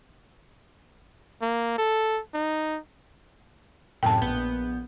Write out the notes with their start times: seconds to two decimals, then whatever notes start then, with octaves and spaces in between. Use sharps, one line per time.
1.42 A#3
1.78 A4
2.34 D#4
4.03 F#2 A2 C3 G5 A5
4.21 A#1 B3 G6